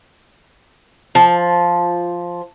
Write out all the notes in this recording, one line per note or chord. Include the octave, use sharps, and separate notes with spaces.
F3